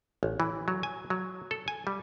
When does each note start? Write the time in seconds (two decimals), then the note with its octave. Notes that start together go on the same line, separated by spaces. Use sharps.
0.23 A1
0.40 E3
0.68 F#3
0.83 G#5
1.10 F#3
1.51 A4
1.68 G#5
1.87 G3